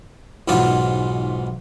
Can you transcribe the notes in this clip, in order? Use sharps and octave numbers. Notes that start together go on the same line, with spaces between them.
B1 G#2 E3 B3 F4 E5